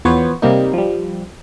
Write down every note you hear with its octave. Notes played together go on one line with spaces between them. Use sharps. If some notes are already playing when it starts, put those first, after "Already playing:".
E2 F3 B3 C5 C#5
C3 G3 A#3 D#4
F3 G3